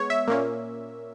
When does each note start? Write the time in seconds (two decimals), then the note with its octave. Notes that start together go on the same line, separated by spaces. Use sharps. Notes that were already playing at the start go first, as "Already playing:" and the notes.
Already playing: G#3 B3 C#5
0.10 E5
0.28 A#2 A#3 C#4